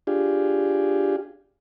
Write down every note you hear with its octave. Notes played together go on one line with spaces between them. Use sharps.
D4 F4 G4 G#4